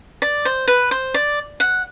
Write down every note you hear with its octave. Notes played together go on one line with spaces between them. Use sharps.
D5
C5
B4
C5
D5
F#5